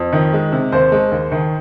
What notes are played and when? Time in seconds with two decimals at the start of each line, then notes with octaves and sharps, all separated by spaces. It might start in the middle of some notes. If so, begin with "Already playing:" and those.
Already playing: F2
0.13 D#3
0.33 G#3
0.52 C3
0.72 D#2 C5
0.92 G#3
1.12 D#2
1.32 D#3